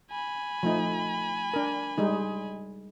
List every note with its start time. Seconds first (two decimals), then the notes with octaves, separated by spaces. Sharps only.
0.11 G#5 B5
0.63 F3 A3 D#4
1.54 D4 A#4
1.98 G3 G#3 D#4